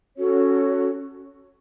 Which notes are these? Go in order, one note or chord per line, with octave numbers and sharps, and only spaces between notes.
C#4 F#4 A4 C#5